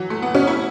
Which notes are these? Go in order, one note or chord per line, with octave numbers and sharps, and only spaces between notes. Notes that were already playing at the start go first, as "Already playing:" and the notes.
Already playing: E3 F#3
A3
B3
C#4
E4